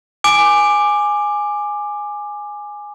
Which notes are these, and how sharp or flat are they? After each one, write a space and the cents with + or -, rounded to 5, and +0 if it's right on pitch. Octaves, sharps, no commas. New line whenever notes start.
G#5 +0 D6 +15